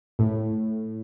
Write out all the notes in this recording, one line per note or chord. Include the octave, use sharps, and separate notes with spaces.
A2